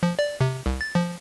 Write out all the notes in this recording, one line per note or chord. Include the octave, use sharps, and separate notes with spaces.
F3
D5
C3
C2
A6
F3